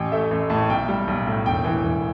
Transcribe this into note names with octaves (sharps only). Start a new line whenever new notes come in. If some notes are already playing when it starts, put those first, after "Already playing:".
Already playing: A1 G5
A3 E5
A1
A2 A5
B1 G5
G3
B1
A2
E1 G5
E3
E1